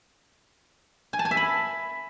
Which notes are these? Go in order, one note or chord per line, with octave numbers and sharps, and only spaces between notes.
G#5
A5
G#5
E5
B5